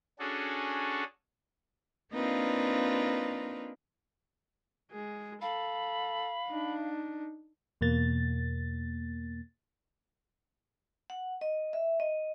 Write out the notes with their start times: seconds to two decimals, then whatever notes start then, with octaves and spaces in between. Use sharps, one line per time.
0.19 C#4 D4 F#4 G#4 A4
2.12 A#3 C4 D4 D#4 F4 B4
4.92 G#3 G#4
5.41 A4 F5 B5
6.47 D4 D#4
7.81 E2 B2 A#3 A6
11.10 F#5
11.41 D#5
11.73 E5
12.00 D#5